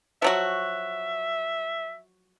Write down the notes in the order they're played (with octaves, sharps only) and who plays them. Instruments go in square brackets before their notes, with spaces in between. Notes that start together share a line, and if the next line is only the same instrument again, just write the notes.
[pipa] F3 F#3 F#4 [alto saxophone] E5